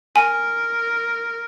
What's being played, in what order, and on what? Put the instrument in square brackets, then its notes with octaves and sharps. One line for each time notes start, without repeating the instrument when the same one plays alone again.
[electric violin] A#4 [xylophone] G#5